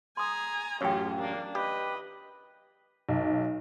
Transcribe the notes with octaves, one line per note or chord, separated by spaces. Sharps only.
G#4 G#5 A#5 C6 D#6
A1 F#2 F4 G4 G#4 C#5 G5
A#3 D4
G4 B4 D#5
B1